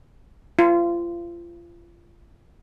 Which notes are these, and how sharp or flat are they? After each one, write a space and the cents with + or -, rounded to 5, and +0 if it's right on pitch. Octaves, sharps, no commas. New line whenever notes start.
F4 -30